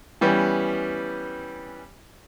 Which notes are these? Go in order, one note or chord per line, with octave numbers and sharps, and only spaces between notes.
E3 G3 B3 C#4